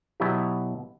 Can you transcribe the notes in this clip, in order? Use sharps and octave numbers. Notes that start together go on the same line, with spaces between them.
B2 F#3 B3 E4 G4